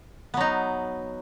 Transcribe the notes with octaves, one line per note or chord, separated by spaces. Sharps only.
F#3 B3 D#4